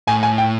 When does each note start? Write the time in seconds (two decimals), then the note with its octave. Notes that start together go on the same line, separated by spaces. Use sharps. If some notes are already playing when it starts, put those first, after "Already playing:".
0.07 A2 G#5
0.23 G#5
0.38 G5